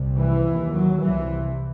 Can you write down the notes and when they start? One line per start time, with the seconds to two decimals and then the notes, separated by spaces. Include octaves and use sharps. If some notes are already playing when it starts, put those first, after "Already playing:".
Already playing: C2 C3
0.18 E3
0.47 D#2
0.75 F#3
1.03 C2 C3 E3